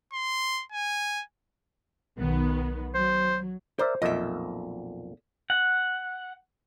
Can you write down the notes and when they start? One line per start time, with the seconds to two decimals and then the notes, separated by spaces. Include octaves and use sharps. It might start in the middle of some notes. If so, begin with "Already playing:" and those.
0.13 C6
0.72 G#5
2.18 B1 D#3 B3
2.95 F#3 C5
3.79 A#4 C5 D5 E5
4.02 B1 F2 A#2 D#5 E5
5.50 F#5